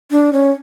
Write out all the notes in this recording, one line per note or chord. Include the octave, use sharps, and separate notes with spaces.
D4
C#4